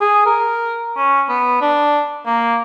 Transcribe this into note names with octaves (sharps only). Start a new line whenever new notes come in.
G#4
A#4
C#4
B3
D4
A#3